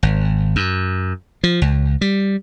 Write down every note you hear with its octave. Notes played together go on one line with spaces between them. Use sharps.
G#1
F#2
F3
C#2
G3